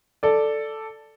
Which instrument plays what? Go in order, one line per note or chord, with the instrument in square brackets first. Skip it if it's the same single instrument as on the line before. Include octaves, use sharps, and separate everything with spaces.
[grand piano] A4 D5